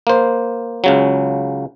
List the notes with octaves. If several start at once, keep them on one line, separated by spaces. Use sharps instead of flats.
A#3 C5
C#2 C#3 F#3